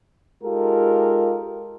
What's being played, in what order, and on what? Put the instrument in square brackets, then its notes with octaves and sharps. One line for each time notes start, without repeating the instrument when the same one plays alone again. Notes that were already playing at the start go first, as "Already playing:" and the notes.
[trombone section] G#3 D#4 F4 G4 A4 A#4